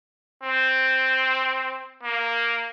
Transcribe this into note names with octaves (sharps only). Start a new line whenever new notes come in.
C4
A#3